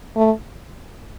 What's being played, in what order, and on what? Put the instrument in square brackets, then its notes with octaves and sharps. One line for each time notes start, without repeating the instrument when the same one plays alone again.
[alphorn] A3